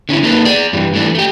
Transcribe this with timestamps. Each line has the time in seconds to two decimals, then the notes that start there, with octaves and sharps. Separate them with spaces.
0.09 D3 C#4 D#4 E4
0.23 A#3 D#4 A4 B4
0.45 G#4 D5
0.73 G2 E3 G3
0.94 E3 A3 D4
1.15 A3 G4